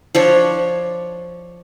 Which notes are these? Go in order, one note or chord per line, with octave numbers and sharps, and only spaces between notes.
F3 D4 C#5